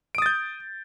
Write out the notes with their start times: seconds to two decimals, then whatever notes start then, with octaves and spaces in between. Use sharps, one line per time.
0.15 D7
0.18 D#6
0.22 A6
0.26 G6